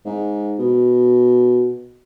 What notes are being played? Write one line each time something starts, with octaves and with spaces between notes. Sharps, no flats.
G#2
B2